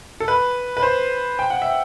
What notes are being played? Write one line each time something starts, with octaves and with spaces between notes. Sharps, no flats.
A4
B4
B4
C5
G5
F#5
E5